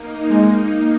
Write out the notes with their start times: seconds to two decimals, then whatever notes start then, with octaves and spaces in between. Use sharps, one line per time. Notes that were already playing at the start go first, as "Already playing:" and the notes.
Already playing: A#3 D#4
0.30 G#3